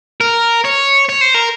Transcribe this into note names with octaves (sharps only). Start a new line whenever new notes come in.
A#4
C#5
C#5
C5
A#4